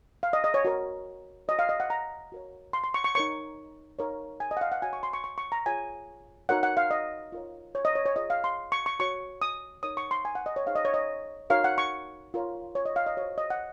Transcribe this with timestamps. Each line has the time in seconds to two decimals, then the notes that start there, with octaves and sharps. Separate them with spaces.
0.23 F5
0.33 D#5
0.44 D#5
0.54 C#5
0.65 F#4 A#4 C#5
1.48 F#4 C#5 D#5
1.59 F5
1.69 D#5
1.80 F#5
1.90 A#5
2.32 F#4 A#4 C#5
2.73 C6
2.84 C6
2.94 C#6
3.04 C#6
3.15 D#4 A#4 C#5 C#6
3.99 D#4 A#4 C#5
4.40 G#5
4.51 D#5
4.57 F#5
4.61 F5
4.72 F#5
4.82 F#4 C#5 G#5
4.93 C#6
5.03 C6
5.13 C#6
5.24 C#6
5.38 C#6
5.52 A#5
5.66 F4 G#4 C#5 G#5
6.49 D#4 F#4 A#4 C#5 F#5
6.63 F#5
6.77 F5
6.91 D#5
7.32 F4 A#4 C#5
7.75 C#5
7.85 D#5
7.95 C#5
8.05 C#5
8.16 F4 G#4 C#5 D#5
8.30 F5
8.44 C6
8.72 C#6
8.86 C#6
9.00 F#4 C#5 C#6
9.42 D#6
9.83 D#4 A#4 C#5 D#6
9.97 C#6
10.11 C6
10.25 G#5
10.35 F#5
10.46 D#5
10.56 C#5
10.66 D#4 G#4 C5 F5
10.76 D#5
10.85 C#5
10.94 D#5
11.50 D#4 F#4 A#4 C#5 F5
11.64 F#5
11.78 C#6
12.34 F4 A#4 C#5
12.75 C#5
12.85 D#5
12.96 F5
13.06 D#5
13.17 F#4 C5 C#5
13.38 D#5
13.50 F#5